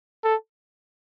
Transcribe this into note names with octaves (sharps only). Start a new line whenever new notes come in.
A4